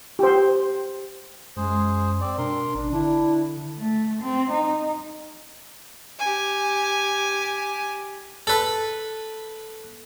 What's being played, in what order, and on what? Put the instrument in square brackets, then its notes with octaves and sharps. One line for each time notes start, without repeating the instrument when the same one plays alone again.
[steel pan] G4 C5
[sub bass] F#2 [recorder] G#3 [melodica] G#4 C5
[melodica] C4 D5
[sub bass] B2 [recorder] D4 [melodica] A#4 C6
[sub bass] G#1 [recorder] D4
[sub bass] D3 [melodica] D4 [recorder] E4
[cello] A3
C4
D#4
[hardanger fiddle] G4 G#5
[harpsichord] A4 B4